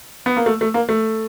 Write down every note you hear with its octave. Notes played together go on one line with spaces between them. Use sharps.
B3
A#3
A3
A3
A#3
A3